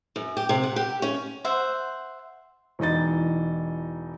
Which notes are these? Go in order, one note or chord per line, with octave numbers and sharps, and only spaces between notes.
F#2
G4
C3
F#5
G4
C#4
C5 E5 F#5
E1 E3 D#4 D#5 A6